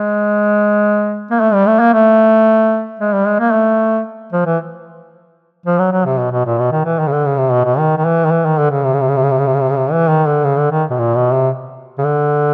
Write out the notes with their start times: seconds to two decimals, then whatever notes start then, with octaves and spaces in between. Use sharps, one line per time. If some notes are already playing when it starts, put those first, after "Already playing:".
Already playing: G#3
1.31 A#3
1.40 A3
1.53 G3
1.67 A3
1.79 A#3
1.93 A3
2.99 G#3
3.13 G3
3.26 G#3
3.39 A#3
3.52 A3
4.32 F3
4.46 E3
5.66 F3
5.79 F#3
5.92 F#3
6.05 C3
6.19 B2
6.32 B2
6.45 A#2
6.59 B2
6.72 D#3
6.85 E3
6.99 D#3
7.07 C#3
7.12 D3
7.25 C#3
7.38 C3
7.52 B2
7.64 B2
7.78 D#3
7.97 D#3
8.05 E3
8.25 D#3
8.31 E3
8.45 D#3
8.58 D3
8.71 C#3
8.84 C3
8.93 C#3
9.01 C3
9.08 C#3
9.16 C3
9.22 C#3
9.30 C3
9.38 C#3
9.46 C3
9.53 C#3
9.61 C3
9.70 C#3
9.77 C3
9.91 E3
10.09 D#3
10.26 D3
10.44 C#3
10.58 D3
10.71 D#3
10.90 B2
10.98 A#2
11.15 B2
11.33 C3
11.98 C#3
12.04 D3